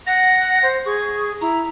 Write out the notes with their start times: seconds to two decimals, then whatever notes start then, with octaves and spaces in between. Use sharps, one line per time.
0.07 F#5 A#6
0.63 C5
0.86 G#4 C#6
1.41 E4 A#5